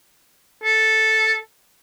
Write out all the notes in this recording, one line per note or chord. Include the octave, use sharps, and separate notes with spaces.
A4